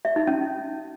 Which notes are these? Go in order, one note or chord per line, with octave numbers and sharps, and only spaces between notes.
E5
D#4
C#4